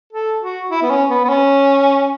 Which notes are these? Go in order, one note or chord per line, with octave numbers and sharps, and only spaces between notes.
A4
F#4
E4
B3
C#4
B3
B3
C#4